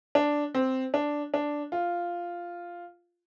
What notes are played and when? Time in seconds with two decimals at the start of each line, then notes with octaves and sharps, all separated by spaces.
0.15 D4
0.55 C4
0.94 D4
1.34 D4
1.72 F4